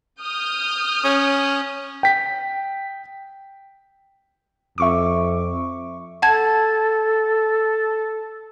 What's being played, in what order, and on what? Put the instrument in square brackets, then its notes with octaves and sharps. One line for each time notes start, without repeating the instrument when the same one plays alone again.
[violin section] D#6 F6 G6
[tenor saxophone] C#4
[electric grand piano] G5 B6
[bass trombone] F2 [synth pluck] E5 C#6 D6
[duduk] A4 [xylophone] F#5 A5 G#6